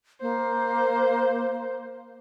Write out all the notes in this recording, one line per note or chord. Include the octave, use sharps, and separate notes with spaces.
A#3 C5